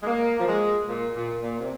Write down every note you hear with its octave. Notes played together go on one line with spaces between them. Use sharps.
G#3
A#3
F3
G#3
A#2
A#2
A#2
C3